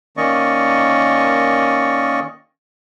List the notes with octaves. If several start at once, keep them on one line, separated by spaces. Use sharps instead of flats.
D#3 A#3 C#4 D5 D#5 C#6